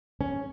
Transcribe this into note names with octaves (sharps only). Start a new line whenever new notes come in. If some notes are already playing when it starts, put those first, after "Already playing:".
C#4